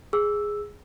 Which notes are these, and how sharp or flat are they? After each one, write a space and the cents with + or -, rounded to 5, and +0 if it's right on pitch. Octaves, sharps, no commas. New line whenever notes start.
G#4 +0 E6 +0